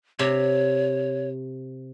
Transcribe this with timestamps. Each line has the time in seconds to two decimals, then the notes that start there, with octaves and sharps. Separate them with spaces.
0.19 C3 C#5